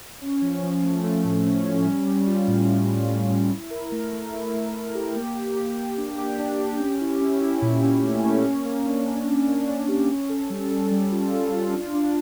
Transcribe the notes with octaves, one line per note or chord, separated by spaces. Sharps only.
C#4
F3
F3
A3
A3
A2
C#4
C#4
G3
G3
F4
A2
C#4
F4
C#4
A2
E4
A#4
A3
A3
E4
A3
A#4
G4
A#3
G4
G4
G4
D4
G4
D4
G4
C#4
E4
C#4
E4
A#2
C#4
A3
C#4
A#3
A#3
D4
A#3
D4
D4
D4
G4
C#4
A4
G3
A4
G3
F4
A4
F4
D4
D4